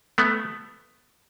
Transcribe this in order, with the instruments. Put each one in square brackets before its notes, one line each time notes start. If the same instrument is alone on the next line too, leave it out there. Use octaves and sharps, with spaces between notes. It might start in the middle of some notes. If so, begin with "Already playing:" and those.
[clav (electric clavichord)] A3 B3